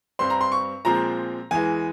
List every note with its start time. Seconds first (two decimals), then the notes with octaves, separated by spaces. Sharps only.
0.19 G2 G3 C4 C6
0.30 A#5
0.41 C6
0.52 C#6
0.85 A#2 F3 G#3 C4 A#5
1.51 E2 E3 G#3 G#5